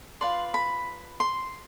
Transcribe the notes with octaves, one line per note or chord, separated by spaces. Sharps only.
F4 B4 D5 C6
B5
C6